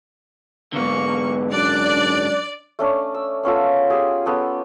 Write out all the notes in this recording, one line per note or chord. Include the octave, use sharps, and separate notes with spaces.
G#2 D3 A#3 B3 C#6
F#2 D4 D5 F#6
A3 C#4 D4
E6
B3 C#4 F4 A4
G4 G#4
B3 C#4 A4